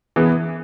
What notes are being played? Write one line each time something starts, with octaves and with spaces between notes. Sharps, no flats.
E3 B3 G#4